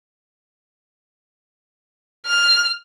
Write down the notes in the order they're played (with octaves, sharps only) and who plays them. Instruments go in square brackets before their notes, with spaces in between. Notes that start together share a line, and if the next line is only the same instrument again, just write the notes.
[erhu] F6